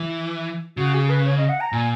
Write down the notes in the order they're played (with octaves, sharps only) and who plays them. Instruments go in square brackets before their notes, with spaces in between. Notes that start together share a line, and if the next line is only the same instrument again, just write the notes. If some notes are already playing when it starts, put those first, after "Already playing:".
Already playing: [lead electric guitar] E3
[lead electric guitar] C#3 [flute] F#4
[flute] G#4
B4
C#5
D#5
F#5
A#5
[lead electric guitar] A#2 [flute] G#5